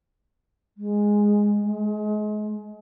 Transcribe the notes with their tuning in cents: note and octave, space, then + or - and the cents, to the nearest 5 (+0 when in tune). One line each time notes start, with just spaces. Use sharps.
G#3 -5
G#3 +30